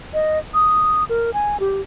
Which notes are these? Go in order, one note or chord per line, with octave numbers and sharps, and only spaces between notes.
D#5
D#6
A#4
G#5
G4